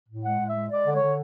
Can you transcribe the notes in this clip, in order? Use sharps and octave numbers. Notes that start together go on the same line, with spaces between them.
A2
G#3 F#5
A2
E5
G#3
G#3 D5
D3
C#5
D3